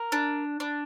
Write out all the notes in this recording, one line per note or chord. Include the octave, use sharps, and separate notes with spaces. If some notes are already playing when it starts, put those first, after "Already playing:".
Already playing: A#4
D4
D4